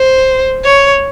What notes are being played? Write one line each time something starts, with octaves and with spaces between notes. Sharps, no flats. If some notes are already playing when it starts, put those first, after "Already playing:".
Already playing: C5
C#5